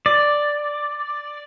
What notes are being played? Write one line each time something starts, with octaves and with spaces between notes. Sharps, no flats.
D5